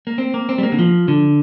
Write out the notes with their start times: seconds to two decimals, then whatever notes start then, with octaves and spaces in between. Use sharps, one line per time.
0.07 A#3
0.18 C4
0.34 A#3
0.49 C4
0.58 G3
0.63 A#3
0.72 D3
0.79 F3
1.08 D3